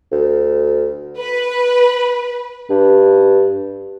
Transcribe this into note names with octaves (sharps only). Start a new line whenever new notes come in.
D2
B4
G2